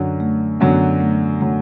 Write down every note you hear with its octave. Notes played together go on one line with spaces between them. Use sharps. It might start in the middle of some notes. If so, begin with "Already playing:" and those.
Already playing: F#2 D3 F#3
A3
F#2 D3 F#3 B3
A3
D3 F#3 A3